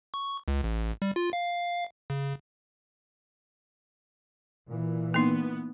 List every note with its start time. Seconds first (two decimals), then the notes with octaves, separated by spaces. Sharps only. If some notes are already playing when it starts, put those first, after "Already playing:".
0.14 C#6
0.48 C#2
0.64 A1
1.02 G3
1.16 F4
1.33 F5
2.10 C#3
4.68 A#2 E3
5.14 A#3 B3 D#4